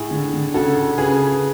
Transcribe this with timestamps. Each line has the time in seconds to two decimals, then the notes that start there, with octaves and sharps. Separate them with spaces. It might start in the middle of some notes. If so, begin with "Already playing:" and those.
Already playing: A2 E4 G#4
0.11 D3
0.34 D3
0.54 C#3 F#4 A4
0.76 C#3
0.98 C#3 G#4 B4
1.20 C#3